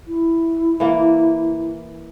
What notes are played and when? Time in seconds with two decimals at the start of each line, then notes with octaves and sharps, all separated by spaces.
0.08 E4
0.80 E3 A#3